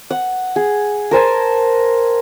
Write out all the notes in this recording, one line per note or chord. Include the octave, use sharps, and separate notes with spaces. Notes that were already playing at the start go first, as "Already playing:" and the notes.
F#5
G#4
A#4 C5 G#5 A5